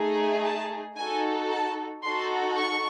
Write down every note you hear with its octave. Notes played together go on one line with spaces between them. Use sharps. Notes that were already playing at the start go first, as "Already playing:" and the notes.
Already playing: A3 D#4 G#4
A5
D#4 F#4 A4 G#5
A5
D#4 F#4 A4 C6
C#6